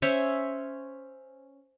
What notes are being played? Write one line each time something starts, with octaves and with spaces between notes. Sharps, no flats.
C#4 C5 C#5 E5